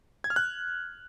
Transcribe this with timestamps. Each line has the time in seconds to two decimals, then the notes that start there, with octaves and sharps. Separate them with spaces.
0.24 G#6
0.30 F6
0.36 F#6